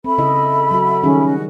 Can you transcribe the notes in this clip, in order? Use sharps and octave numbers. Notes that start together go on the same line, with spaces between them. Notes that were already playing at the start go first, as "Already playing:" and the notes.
C4 A4 E5 B5
C#3 E4 D#5
F#3 F#4
D#3 G3 C#4 G#4
F#4 D#5